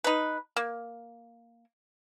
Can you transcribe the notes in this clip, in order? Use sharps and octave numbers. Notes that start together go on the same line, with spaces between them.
D#4 B4
A#3